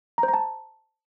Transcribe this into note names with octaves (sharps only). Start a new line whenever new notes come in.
A#5
C5
A#5
A5